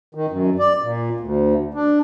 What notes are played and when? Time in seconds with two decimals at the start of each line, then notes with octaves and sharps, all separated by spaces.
0.15 D#3
0.30 F#2
0.59 D5
0.82 A#2
1.20 D2
1.74 D4